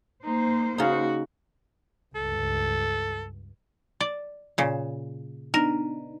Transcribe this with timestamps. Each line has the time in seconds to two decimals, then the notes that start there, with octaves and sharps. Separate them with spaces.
0.24 A#3 D#4 C5
0.78 C#3 D#4 F#4
2.15 C#2 G2 A4
4.01 D5
4.58 A#2 C#3
5.54 B3 D4 D#4 A#4